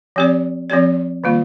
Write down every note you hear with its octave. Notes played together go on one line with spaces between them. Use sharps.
F3 C4 G4 D5
F3 C4 G4 D5
D#3 G3 A#3 F4